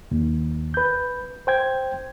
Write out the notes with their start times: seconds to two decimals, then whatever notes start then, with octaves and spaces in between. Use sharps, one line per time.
0.11 D#2
0.74 B4 G6
1.47 C5 G5 G#6